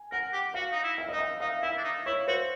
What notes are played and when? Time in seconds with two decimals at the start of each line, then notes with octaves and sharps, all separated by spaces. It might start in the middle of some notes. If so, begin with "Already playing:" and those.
Already playing: G#5
0.12 A#4 F#5
0.33 G4
0.54 F#4 F5
0.72 D#4
0.83 E4
0.98 E5
1.09 D#4 D#5
1.19 E5
1.40 D#4 F5
1.62 E4 E5
1.77 D4
1.84 D#4
2.06 E4 C#5
2.28 F#4 C5